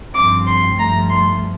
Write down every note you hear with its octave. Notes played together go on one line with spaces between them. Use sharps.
G2 F3 C4 D6
C6
G2 F3 A3 A#5
C6